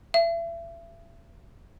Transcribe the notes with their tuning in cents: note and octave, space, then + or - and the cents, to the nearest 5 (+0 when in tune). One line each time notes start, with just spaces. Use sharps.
E5 +35